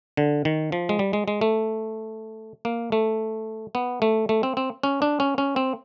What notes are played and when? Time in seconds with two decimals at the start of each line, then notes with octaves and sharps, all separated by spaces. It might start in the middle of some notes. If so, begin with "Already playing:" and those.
0.17 D3
0.45 D#3
0.72 F3
0.89 G#3
0.99 G3
1.13 G#3
1.28 G#3
1.41 A3
2.65 A#3
2.92 A3
3.75 B3
4.02 A3
4.29 A3
4.43 C4
4.57 C4
4.83 C#4
5.02 D4
5.20 C#4
5.38 C#4
5.56 C4